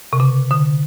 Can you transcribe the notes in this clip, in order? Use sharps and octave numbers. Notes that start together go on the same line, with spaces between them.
C3
C#3
D3